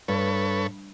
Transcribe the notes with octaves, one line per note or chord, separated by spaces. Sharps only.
G2 A4 B4 C#5